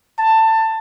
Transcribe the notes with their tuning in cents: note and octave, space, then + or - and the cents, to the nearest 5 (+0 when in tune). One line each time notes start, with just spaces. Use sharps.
A5 +20